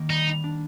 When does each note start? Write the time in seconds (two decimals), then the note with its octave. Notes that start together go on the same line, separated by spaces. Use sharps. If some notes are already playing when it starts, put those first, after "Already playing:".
Already playing: D#3 A#3
0.09 G3 D#4
0.26 G3
0.44 D4